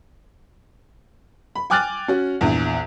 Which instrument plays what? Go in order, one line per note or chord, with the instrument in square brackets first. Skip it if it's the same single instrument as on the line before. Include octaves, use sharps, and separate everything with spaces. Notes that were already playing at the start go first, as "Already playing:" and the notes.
[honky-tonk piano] B5
G5 G#5 D6 F6 F#6 A6
C#4 F#4
A#1 E2